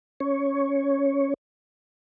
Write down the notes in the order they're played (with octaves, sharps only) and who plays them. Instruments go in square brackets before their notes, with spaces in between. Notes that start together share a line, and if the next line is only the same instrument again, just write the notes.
[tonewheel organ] C#4 C#5